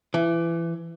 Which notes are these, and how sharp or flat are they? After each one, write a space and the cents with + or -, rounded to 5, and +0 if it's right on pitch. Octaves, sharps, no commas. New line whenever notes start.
E3 +25